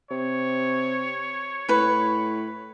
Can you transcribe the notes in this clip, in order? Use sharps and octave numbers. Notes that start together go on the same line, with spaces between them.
C3 C#5
A2 B4 B5